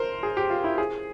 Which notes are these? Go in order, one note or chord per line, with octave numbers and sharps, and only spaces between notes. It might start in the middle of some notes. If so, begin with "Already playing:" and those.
Already playing: A#4 C5
G#4
G4
F4
E4
G#4